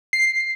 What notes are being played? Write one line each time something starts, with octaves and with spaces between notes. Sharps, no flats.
C7